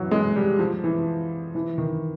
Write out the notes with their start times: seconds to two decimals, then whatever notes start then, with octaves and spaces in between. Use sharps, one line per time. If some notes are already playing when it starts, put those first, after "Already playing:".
Already playing: E3 F#3
0.11 G#3
0.36 G3
0.59 F3
0.84 E3
1.55 E3
1.78 D#3